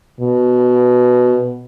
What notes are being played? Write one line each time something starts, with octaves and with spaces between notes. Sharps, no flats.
B2